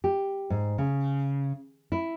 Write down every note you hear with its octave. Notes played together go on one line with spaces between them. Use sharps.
G4
G#2
C#3
E4